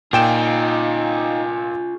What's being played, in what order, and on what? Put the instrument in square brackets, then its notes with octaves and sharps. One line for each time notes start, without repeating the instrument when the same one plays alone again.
[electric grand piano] A#2 G5 E7 [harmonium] D#4 [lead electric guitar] F4 G#4